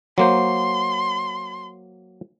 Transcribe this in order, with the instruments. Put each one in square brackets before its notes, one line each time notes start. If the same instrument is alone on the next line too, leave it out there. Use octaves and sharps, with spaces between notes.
[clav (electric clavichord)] F#3 A#3 C5 [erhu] C6